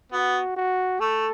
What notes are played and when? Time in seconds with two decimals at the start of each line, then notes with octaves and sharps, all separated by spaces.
0.12 B3 F#4
0.56 F#4
1.00 A3 A4